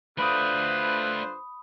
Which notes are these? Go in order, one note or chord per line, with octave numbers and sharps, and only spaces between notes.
D3 A3 F4 B4 C5 D5 B5 D#6